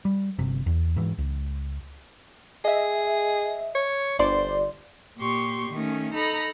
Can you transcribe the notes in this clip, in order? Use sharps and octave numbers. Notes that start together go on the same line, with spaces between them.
G3
G1 C3
E2
G#2 E3
C#2
G#4 D#5 E5
C#5
G1 C5 D5 C6
A#2 G4 C6 C#6
D#3 A3 C#4
D#4 A4 A#5 B5